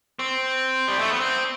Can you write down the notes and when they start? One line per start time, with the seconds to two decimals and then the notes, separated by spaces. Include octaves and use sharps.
0.19 C4
0.88 G3
0.99 A3
1.10 B3
1.20 C4